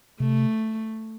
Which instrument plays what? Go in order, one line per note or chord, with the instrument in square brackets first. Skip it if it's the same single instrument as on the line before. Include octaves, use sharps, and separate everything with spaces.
[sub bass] C3 [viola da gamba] A3